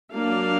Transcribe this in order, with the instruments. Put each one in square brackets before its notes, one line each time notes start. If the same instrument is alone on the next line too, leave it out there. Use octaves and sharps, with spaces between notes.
[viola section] F#3 A#3 D4 F5